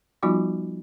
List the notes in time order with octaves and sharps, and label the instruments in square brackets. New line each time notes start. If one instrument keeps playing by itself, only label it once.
[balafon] F3 G3 B3 D#4 F4 F#4